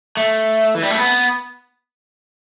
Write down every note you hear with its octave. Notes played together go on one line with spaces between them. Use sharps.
A3
E3
G3
A3
B3